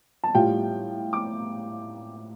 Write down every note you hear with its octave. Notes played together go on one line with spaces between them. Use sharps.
A5
A2 G3 F4 G5
D6